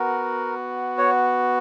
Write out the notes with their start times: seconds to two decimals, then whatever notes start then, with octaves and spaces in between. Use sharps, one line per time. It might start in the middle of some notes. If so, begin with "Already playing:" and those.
Already playing: B3 F#4 A#4
0.98 C#5